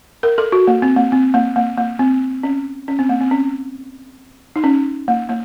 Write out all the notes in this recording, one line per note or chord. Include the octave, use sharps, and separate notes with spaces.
A#4
A4
F#4
A#3
C4
A#3
C4
A#3
A#3
A#3
C4
C#4
C#4
C4
A#3
C4
C#4
D#4
C#4
A#3
A#3